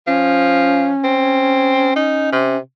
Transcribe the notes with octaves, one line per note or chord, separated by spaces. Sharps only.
F3 C#4
C4
D#4
C3